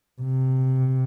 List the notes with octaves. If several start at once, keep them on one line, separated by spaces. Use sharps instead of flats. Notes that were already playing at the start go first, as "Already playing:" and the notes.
C3